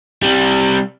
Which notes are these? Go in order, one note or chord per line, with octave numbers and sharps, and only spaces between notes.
C3 G3